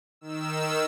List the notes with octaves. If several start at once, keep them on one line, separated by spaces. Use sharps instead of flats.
D#3 E6